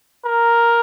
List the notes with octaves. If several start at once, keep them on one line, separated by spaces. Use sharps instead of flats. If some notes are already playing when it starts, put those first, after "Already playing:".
A#4